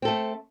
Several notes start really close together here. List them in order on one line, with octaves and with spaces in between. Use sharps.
C4 A4 A3